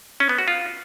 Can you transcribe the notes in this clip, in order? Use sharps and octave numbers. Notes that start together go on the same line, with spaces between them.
C#4
B3
F#4
F4